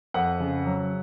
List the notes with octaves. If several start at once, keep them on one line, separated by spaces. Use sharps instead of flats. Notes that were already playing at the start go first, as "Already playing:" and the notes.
F2 F#5
C#3
F#3